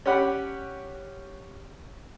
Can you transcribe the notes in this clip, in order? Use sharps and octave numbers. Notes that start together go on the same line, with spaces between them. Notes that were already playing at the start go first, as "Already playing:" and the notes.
C#4 G4 D5 F#5 B5